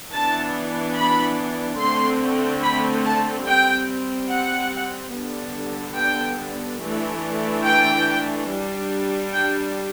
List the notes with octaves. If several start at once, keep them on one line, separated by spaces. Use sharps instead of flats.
E3 B3 D4 A5
B5
D3 A3 C4 C6
B5
A5
G3 C4 G5
F#5
D3 G3 B3 D4
G5
E3 A3 D4
G5
G3 D4
G5